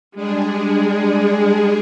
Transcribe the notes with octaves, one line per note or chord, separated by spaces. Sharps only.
G3 G#3 D4 G#4